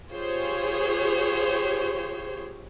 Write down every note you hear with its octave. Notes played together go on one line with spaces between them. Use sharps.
F4 G4 G#4 C5 C#5